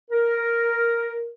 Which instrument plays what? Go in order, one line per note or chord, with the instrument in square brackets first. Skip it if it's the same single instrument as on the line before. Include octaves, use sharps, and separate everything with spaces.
[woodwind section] A#4